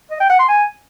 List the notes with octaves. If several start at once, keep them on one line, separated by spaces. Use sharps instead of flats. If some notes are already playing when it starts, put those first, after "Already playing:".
D#5
G5
F#5
C6
G#5